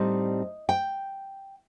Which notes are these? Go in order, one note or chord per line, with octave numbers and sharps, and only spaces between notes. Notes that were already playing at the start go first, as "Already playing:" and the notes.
Already playing: A2 G3 C4 D#4 D#5
G5